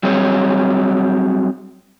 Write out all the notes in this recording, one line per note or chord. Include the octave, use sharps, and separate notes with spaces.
F#3 G3 C4 G#4 C#5